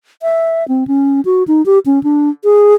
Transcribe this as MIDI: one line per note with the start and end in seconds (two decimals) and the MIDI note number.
0.22 0.67 76
0.68 0.87 60
0.87 1.21 61
1.25 1.43 66
1.48 1.64 63
1.66 1.79 67
1.86 2.02 61
2.03 2.29 62
2.44 2.74 68